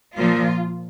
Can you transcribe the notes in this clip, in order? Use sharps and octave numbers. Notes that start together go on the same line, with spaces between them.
A#2 F3 F4